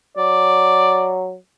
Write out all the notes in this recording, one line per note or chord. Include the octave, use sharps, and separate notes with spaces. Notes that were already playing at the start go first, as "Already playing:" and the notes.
F#3 D5